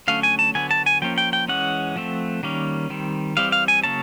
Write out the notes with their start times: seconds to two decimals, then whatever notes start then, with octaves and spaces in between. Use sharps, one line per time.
0.08 D3 F#3 A3 C#4 F5
0.23 G#5
0.39 A5
0.55 D3 F#3 B3 G#5
0.71 A5
0.86 G#5
1.02 F3 A#3 C#4 G5
1.18 G5
1.33 G5
1.48 E3 G#3 C#4 F#5
1.96 F3 A3 C4
2.43 D#3 G3 A#3 C#4
2.90 D#3 G3 C4
3.37 E3 G3 C4 F5
3.52 F5
3.68 G#5
3.83 C#3 F#3 A#3 C#4 A5